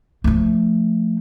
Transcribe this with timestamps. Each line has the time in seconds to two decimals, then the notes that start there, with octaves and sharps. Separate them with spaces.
0.24 F3 A3